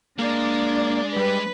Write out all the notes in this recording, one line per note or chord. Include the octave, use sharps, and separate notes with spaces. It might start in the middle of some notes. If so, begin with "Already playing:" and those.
G#3 A#3 D4 D5
G3 B4